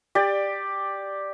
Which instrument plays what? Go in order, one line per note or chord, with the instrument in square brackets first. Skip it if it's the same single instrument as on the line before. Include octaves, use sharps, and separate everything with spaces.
[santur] G4 D5